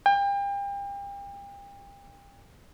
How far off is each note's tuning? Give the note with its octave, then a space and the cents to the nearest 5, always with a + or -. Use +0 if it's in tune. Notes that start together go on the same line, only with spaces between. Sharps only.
G5 +35